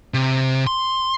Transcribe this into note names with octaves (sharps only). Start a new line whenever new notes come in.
C3
C6